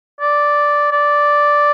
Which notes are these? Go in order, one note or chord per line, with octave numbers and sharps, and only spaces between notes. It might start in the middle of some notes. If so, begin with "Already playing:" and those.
D5
D5